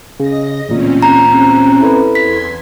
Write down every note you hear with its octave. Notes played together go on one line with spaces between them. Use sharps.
C#3 D#5 A#6
A1 D2 A#2 C4 C#4
A#5
E4 A4 B4
E2 C6 G#6 B6